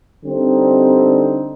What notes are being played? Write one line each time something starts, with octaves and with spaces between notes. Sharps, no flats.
D3 G3 C4 D#4